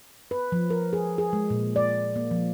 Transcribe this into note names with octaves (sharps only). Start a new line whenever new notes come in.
B4
F3
A#4
G#4
G#4
G#3
A#2
D5
A#3
F3